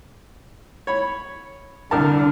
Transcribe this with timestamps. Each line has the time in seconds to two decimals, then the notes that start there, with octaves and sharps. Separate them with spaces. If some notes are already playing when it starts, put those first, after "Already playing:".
0.87 C#5 B5
1.91 C2 D3 A#4 A5